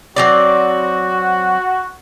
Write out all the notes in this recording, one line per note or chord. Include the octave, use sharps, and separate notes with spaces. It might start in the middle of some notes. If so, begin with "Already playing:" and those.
F#3 C4 F#4 D5